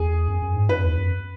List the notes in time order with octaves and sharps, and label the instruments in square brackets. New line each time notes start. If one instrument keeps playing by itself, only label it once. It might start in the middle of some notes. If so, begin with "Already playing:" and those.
Already playing: [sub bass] E2 [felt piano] G#4
[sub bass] F#2
F#2
G#2
[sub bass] F#2 [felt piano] B4
[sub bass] E2
F#2